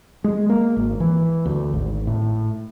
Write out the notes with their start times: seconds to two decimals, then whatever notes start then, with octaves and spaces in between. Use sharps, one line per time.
0.24 G#3
0.49 A#3
0.77 G#1
1.00 E3
1.46 D2
1.73 G#1
2.07 A2